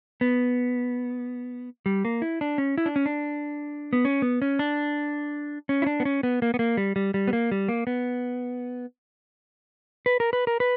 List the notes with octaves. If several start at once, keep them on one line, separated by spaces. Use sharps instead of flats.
B3
G3
A#3
E4
D4
C#4
E4
D4
C#4
D4
B3
C#4
B3
C#4
D4
C#4
E4
D4
B3
C#4
B3
A#3
B3
A#3
G3
G3
G3
B3
A#3
G3
A#3
B3
B4
A#4
B4
A#4
B4